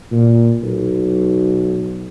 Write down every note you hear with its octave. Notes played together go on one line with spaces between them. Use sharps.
A#2
B1